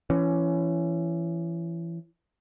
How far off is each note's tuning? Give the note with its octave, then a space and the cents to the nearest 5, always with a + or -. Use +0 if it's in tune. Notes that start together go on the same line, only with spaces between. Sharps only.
E3 +30 C#4 +5